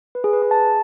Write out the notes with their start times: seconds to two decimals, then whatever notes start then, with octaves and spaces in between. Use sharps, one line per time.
0.15 B4
0.24 G#4
0.33 B4
0.42 G#4
0.51 A5